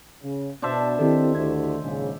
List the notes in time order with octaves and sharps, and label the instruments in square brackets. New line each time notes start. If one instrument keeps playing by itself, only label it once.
[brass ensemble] C#3
[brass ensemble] B2 [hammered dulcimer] D4 C5 E5 [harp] A5
[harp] D#3 [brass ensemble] C4 [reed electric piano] E4 G4 A4
[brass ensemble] D2 [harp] G#6
[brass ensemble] A#1 G#2 C#3